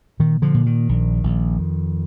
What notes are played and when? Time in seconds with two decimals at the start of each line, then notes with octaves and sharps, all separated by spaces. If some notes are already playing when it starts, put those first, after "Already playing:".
0.20 A#2 D#3
0.42 D3 F3
0.54 A#2
0.66 D#3
0.89 A#1
1.23 A#1
1.58 F2